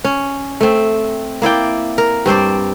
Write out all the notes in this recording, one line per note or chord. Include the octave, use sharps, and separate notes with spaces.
C#4
A3 C4
A#3 E4 D5 G5
A#4
G2 C4 C5 D5